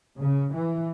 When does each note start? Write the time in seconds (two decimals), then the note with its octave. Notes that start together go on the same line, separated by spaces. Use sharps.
0.20 C#3
0.55 E3